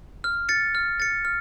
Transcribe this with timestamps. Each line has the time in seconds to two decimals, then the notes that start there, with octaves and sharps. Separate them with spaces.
0.24 F6
0.49 A6 C#7
0.75 F6
1.00 A6 C#7
1.25 F6